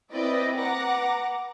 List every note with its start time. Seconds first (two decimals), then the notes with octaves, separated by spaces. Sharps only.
0.11 C4 E4 B4 D5 D#5 G5
0.57 B4 F#5 A#5 D6 A#6